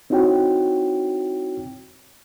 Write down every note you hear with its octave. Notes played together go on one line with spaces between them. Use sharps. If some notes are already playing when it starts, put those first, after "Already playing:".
C4 D#4 E4 F#4 C#5 G5